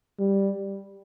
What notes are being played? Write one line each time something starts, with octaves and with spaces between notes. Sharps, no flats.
G3